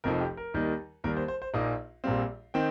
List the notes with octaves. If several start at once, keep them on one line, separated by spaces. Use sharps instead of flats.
F1 F2 F3 D#4 A#4
G4
A#4
D#2 D#3 G3 D#4
D#2 D#3 G3 A#4
C5
C5
C5
A#1 A#2 A#3 D#4 D#5
A#1 A#2 G3 C4 F5
D#3 C4 D#4 G5